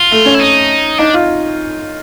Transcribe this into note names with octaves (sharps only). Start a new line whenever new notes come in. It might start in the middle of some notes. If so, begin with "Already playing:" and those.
Already playing: F4
A3
C#4
E4
D#4
D4 D#4
F4